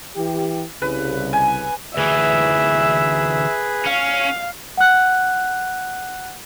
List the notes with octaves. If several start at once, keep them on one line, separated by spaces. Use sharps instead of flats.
E3 G4
C2 C#3 B4
G#5
D2 E3 G#4 B4 E5
C#4 F5
F#5 F#6